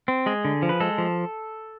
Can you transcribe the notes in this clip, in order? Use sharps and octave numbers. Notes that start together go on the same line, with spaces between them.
C4
G#3 G#4
D3
F3
B4
G#3 A4
F3